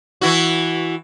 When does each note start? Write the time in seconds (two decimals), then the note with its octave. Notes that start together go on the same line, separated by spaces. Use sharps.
0.21 E3 E4 F#4